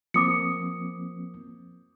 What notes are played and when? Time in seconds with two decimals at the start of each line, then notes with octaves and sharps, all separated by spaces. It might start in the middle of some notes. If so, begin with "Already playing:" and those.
0.14 F3 A#3 C4 D6 D#6 C#7